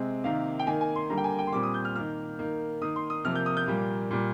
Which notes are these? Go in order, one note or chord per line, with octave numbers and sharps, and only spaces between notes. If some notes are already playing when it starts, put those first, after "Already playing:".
Already playing: C3 G#3 C4
C3 D#3 A#3 F5
G5
D#3 A#3 G#5
G#5
C6
D3 G3 A#3 A#5
G5
G#5
G5
C6
A#2 G3 C4 D6
D#6
G6
F6
D#3 A#3 F6
D#3 A#3
D#3 A#3 D#6
C6
D#6
C3 F3 A#3 F6
G6
D#6
G6
A#2 G3 A#3
A#2 G3 A#3